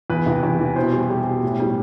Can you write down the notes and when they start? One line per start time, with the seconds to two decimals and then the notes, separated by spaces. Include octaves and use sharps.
0.10 E2 B4
0.26 C3
0.43 E2
0.59 E3
0.76 B2 C5
0.93 G3
1.10 G3
1.27 B2
1.43 A2
1.60 G3